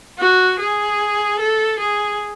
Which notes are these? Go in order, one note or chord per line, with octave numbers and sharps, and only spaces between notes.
F#4
G#4
A4
G#4